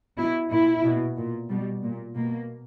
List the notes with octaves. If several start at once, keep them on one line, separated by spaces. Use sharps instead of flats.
B2 E4
A#2 E4
B2
A#2
B2 G3
A#2
B2 A#3